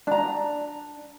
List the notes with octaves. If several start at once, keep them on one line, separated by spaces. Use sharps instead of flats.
D4 A#5